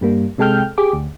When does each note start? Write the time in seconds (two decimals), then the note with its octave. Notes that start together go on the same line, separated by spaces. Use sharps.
0.01 G2 G3 A#3
0.38 C3 G#3 A4 G5 F6 G6
0.78 G4 G#4 D6
0.93 D2